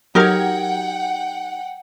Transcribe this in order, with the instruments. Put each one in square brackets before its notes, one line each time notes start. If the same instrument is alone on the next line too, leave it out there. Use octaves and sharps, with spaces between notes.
[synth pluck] F#3 G#6 [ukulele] D#4 G4 A#4 [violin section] F#5 G5